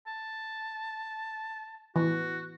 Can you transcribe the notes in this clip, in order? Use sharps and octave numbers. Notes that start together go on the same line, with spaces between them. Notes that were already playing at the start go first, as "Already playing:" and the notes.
A5
E3 F#4